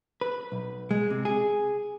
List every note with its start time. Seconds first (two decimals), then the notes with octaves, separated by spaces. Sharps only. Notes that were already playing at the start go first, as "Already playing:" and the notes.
0.21 B4
0.52 B1
0.91 G#3
1.10 C3
1.25 G#4